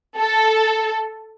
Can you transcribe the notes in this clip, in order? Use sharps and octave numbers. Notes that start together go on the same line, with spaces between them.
A4